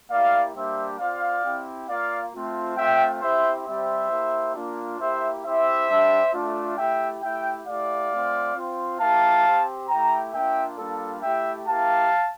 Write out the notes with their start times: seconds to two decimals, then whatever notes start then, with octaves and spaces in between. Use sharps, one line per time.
0.11 A#3 E4 G4 D5 F5
0.54 G3 A#3 D4 G4 C5 E5
0.99 C4 F4 D5 F5
1.43 C4 E4 G4
1.89 A#3 F4 D5 F5
2.33 A3 C4 F4
2.77 A3 C4 F4 E5 G5
3.21 C4 E4 G4 C5 E5
3.66 G3 C4 G4 C5 E5
4.10 A#3 E4 G4
4.55 A#3 D4 F4
4.99 A#3 E4 G4 C5 E5
5.44 C4 E4 G4 C5 E5
5.89 G3 D4 G4
6.33 A3 D4 F4
6.77 A3 E4 G4 E5 G5
7.22 A3 E4 G4 E5 G5
7.66 A3 E4 G4 D5 F5
8.11 A3 C4 F4
8.55 C4 F4
9.00 A#3 E4 G4 F5 A5
9.45 C4 G4
9.89 A3 E4 G4 G5 A#5
10.33 A#3 D4 F4 E5 G5
10.78 G3 A#3 D4 F4 A4
11.22 A3 E4 G4 E5 G5
11.67 A#3 E4 G4 F5 A5